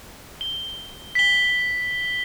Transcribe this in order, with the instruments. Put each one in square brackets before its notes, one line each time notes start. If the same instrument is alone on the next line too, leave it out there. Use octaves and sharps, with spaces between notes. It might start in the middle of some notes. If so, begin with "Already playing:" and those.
[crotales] G7
B6 G7